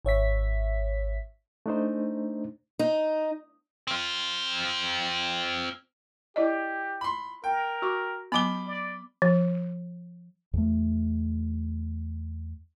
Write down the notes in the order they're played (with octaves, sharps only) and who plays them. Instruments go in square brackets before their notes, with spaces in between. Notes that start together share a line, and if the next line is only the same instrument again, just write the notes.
[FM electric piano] G#1 C#5 E5 B6
[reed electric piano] A3 D4 D#4 C5
[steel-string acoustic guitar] D#4
[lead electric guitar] C4 F4
[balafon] E4 D5 D#5 [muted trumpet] G4
[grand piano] B5 C6
[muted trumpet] A#4 [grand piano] G5
[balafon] F#4 C#6 D6
[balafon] F#3 B3 [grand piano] B5 D6 G7
[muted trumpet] D5
[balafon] F3
[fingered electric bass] E2 A3